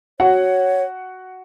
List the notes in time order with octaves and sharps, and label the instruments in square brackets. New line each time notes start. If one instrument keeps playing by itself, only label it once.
[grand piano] F#4 F#5 [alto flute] C#5